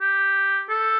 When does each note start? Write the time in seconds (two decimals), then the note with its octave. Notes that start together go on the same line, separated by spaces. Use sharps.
0.01 G4
0.70 A4